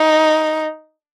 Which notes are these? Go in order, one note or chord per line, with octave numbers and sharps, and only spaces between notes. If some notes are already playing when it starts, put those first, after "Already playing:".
Already playing: D#4